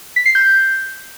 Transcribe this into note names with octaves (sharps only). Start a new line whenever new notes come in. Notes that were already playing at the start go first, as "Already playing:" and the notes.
B6
C7
G6